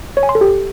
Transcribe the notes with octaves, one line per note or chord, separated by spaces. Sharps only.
C#5
G#5
C6
A4
G4